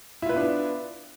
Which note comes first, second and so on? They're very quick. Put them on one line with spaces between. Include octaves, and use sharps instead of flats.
E4 F4 B4 B3 D4